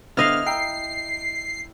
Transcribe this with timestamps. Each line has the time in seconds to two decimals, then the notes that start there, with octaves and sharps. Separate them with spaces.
0.17 D3 B3 E4 C5 D#5 F5 F6
0.46 G5 A#5 E6 C7